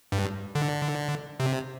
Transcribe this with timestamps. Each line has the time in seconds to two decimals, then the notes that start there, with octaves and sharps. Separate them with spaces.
0.12 G2
0.55 D3
1.40 C3